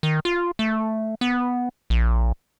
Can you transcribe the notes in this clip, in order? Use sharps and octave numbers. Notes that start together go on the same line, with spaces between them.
D#3
F4
A3
B3
A#1